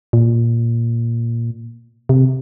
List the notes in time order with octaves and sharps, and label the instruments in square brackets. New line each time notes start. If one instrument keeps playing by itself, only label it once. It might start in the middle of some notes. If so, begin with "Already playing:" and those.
[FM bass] A#2
C3